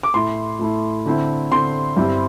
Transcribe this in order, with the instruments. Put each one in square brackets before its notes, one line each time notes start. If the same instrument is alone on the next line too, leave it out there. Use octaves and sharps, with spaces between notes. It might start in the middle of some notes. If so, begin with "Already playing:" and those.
[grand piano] D6
A2 A3 E4 C6
A2 A3 E4
D3 C4 E4
D3 C4 E4 C6
G2 G3 C4 E4